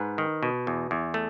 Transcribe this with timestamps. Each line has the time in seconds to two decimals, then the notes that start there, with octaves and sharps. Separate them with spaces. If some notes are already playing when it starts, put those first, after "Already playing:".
Already playing: G#2 B4
0.18 D#3
0.43 B2
0.67 E2
0.91 E2
1.14 A3